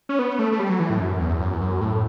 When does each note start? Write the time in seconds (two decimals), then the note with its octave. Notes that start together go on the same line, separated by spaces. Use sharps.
0.09 C#4
0.19 B3
0.39 A3
0.52 A3
0.60 G3
0.70 F#3
0.80 E3
0.90 A2
1.00 F#2
1.20 E2
1.41 F#2
1.54 E2
1.61 F#2
1.81 A2